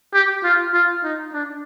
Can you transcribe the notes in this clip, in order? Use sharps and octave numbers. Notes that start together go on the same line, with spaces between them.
G4
F4
F4
D#4
D4